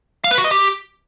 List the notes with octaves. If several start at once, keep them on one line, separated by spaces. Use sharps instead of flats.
F5
B4
F#4
D#5
G4